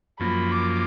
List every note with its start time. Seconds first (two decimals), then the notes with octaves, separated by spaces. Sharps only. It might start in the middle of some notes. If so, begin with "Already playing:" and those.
0.20 F#2 F3 A#3 B5
0.52 D6